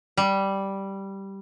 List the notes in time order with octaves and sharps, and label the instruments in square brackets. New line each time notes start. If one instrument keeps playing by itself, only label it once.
[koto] G3